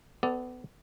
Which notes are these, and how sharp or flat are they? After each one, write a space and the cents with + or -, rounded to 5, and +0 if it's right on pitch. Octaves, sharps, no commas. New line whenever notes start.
B3 +25 A4 +0 D5 +0